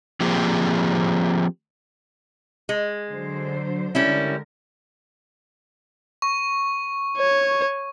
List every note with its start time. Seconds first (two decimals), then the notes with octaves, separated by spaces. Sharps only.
0.20 F3 A#3 C4 F4 G4 G#4
2.69 G#3
3.10 D3 F#3 C5
3.95 D3 G3 G#3 C#4 E4 A#4
6.22 C#6
7.17 C#5